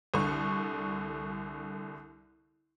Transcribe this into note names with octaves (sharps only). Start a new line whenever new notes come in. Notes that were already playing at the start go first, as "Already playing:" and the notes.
C2 D3 C#6